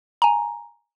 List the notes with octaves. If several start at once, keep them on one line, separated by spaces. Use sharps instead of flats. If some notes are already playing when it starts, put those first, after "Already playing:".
G#5 A#5